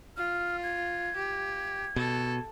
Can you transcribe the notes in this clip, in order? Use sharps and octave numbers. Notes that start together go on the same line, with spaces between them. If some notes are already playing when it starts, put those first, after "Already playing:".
F4 F6
G#6
G4
B2 A4